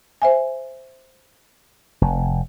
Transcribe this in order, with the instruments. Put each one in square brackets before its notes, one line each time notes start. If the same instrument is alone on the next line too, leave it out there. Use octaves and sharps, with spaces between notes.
[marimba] C5 E5 G#5
[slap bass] F1